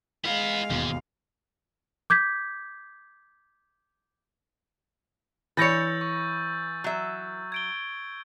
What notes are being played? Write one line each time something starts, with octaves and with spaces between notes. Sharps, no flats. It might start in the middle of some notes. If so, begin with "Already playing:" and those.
G#3 B3 E4 F5
E1 D#2 G#2 B2
D6 G6 G#6 B6
E3 B4 C#5 E6 G6 A6 A#6 C#7
C#6
F#3 E5
G#6 D7 G7